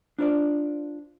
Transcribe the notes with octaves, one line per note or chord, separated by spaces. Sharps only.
D4 F4 C5 D5